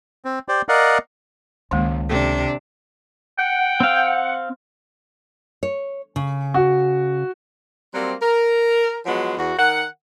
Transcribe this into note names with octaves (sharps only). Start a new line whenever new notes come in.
C4
G4 C5 D5
A#4 D5 D#5 F5 F#5
C#2 D#3 G#3 A#3
C3 D4 A4
F#5 G5
C4 F5
C#5
C#3
F#4
F#3 G3 A#3 C4
A#4
F3 F#3 G#3 B3 F#4
E2 F#4
D#3 A#4 F#5